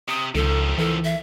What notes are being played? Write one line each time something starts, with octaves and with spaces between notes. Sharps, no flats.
C3 D#6
C#2 D#3 F3 A4
E3 A4
E5